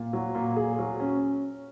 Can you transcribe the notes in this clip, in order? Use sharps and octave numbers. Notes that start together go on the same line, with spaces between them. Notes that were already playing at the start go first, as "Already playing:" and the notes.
Already playing: A#2
F#3
A#2
G#4
F#3
C#4